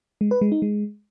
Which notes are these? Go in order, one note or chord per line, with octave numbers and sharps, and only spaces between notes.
G#3
B4
G#3
D#4
G#3